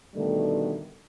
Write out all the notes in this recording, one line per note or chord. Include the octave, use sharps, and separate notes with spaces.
B2 D3 D#3 G3 A3